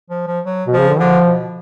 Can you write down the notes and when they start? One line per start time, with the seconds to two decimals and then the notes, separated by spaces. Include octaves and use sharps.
0.10 F3
0.27 F3
0.46 F#3
0.67 B2
0.73 C#3 F3
0.88 D3
1.00 D3 F3
1.26 B2